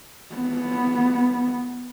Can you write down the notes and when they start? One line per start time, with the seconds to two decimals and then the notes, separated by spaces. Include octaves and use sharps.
0.35 B3